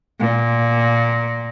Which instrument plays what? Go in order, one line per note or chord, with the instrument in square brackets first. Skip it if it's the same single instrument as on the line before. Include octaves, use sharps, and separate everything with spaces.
[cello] A#2